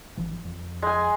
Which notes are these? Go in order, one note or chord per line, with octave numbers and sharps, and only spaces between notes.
G#1 E3 F3
F2
G#3 G#5